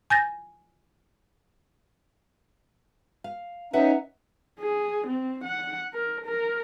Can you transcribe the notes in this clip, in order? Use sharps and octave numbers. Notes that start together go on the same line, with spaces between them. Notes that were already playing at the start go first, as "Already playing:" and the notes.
G#5 G6 A6 A#6
F5
C#4 D#4 B4 E5 F#5
G#4
C4
F#5
A#4
A#4